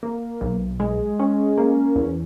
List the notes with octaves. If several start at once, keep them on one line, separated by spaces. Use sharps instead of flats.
A#3
B1
G#3
C#4
A#3
E2